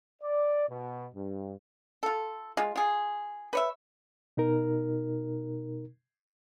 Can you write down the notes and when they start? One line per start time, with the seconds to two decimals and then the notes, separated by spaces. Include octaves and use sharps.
0.22 D5
0.68 B2
1.15 G2
2.03 F4 A4
2.57 G#3 F4
2.76 F4 G#4
3.53 B4 C#5 E5
4.37 B2 D#4 A#4